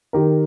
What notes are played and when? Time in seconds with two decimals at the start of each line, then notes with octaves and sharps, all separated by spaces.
0.13 D#3 G4 A#4